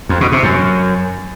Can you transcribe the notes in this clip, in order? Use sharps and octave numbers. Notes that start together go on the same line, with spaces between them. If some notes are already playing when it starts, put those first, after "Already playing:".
F2
B2
C3
F#2